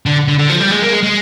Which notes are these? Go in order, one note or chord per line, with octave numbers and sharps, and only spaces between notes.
D3
D3
D3
F3
G3
G#3
A#3
G#3
G#3